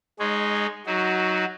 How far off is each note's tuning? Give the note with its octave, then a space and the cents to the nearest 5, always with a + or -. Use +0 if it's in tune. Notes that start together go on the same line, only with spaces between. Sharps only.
G#3 +0 D#4 -25 C#5 +0
F#3 +5 D#4 +20 F#4 +0